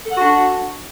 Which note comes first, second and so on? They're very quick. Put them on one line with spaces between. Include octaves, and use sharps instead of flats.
A4 F#5 F#4 D4